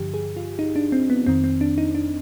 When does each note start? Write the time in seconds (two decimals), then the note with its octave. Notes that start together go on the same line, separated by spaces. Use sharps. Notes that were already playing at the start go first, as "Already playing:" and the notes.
Already playing: G2 D3 F3 G4
0.14 G#4
0.36 F4
0.59 D#4
0.76 D4
0.92 C4
1.10 B3
1.26 F2 D#3 C4
1.44 C4
1.61 D4
1.78 D#4
1.95 D4